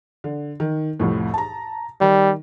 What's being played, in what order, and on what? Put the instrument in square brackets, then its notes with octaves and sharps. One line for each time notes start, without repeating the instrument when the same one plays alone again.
[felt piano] D3
D#3
C2 F2 A2
A5 A#5
[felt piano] D#3 [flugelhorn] G3